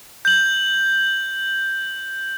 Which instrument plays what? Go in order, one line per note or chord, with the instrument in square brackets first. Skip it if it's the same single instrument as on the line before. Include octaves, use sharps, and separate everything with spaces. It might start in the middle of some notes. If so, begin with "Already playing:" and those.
[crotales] G6 F#7